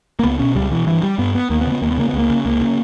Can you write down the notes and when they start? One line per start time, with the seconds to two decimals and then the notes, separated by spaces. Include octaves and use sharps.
0.19 A#3
0.23 C#2 B3
0.40 B2 C#4
0.55 C#2 G3
0.71 B2 E3
0.87 G2 E3
1.03 G3
1.18 G2 B3
1.35 B3
1.50 D#2 A#3
1.61 B3
1.66 C#3
1.72 B3
1.82 D#2 A#3
1.91 B3
1.98 C#3 A#3
2.09 B3
2.13 C#2 A#3
2.30 C#3
2.45 C#2 A#3
2.61 C#3